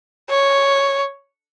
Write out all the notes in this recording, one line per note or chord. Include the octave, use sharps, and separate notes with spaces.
C#5